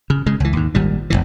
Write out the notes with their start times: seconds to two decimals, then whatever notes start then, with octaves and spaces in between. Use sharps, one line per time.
0.10 C#3
0.26 C#3 G#3
0.40 C#2 E3
0.53 D#2 G#2
0.75 G#1 A#2 G3
1.10 E1 C2 E3